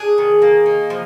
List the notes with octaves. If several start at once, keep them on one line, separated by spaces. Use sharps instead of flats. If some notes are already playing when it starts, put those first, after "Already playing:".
Already playing: D4 G#4
D#3
A#3
D#4
F3